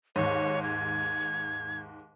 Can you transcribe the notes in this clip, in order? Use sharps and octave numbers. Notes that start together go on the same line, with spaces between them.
D#2 G#2 C#5
G#6